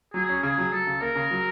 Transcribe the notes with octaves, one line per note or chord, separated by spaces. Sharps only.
F#3 G#4
C#4
C#3 G#4
F#3
F#3 A4
C#3
A#3 A#4
C#3
F#3